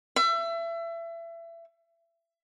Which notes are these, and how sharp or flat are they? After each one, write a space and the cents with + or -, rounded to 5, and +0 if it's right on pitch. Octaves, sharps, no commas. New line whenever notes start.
E5 +30